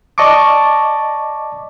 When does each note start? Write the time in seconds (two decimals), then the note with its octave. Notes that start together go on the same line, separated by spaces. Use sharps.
0.18 D5 D#5 A5 C#6 D6